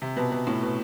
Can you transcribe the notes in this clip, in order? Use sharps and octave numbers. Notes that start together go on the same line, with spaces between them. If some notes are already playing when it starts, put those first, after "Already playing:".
C3
B2
B2
A2
B2